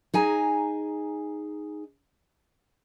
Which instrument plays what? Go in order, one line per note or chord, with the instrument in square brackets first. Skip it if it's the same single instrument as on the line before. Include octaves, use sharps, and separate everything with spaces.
[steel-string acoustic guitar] D#4 G#4 G#5 A#5